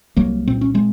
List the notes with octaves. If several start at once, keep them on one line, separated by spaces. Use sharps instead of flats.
C2 F#3 A#3
A#2 C4
C#4
G#3 C4